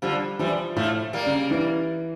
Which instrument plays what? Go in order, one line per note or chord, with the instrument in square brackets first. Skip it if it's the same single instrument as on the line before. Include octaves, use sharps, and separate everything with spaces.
[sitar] D3 F3 [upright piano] G3
[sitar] E3 G3 [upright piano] F3
[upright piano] A2 [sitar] F3 A3
[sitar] G3 A#3
[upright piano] C#3
E3